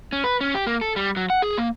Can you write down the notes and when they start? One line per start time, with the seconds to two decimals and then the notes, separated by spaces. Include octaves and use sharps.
0.13 C#4
0.24 B4
0.41 C#4
0.54 G4
0.67 A#3
0.81 A4
0.96 G3
1.16 F#3
1.30 F#5
1.42 G#4
1.58 A#3